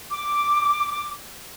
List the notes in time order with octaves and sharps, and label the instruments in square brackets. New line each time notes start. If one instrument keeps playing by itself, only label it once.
[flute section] D6